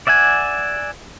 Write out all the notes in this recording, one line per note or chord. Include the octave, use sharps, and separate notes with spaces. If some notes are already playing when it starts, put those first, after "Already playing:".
D5 E5 F#5 G#5